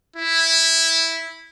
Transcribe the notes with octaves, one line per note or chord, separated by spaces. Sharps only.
E4